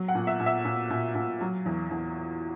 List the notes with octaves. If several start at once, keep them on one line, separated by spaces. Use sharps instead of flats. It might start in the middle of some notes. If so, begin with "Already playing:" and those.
Already playing: F#3
F#5
A#2
E5
A#2
E5
A#2
A#2
A#2
F#3
E2
E2